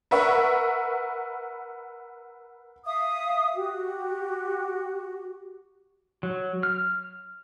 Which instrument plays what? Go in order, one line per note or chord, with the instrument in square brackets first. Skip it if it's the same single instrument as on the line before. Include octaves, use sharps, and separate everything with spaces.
[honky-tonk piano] A#4 B4 E5 F#5 C#6
[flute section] E5 F5 D#6
F#4 G4
[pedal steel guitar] F#3
F6